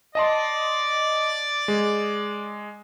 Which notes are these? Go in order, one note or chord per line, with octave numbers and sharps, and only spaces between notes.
D5 D#5 A5 C6
G#3